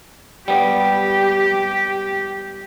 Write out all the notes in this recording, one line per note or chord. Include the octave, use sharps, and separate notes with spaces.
G3 B3 G4